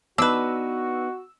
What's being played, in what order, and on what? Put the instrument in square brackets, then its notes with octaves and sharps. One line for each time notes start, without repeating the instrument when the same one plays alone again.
[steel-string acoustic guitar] B3 D#4 [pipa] D4 B4 [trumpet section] F#4 [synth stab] E6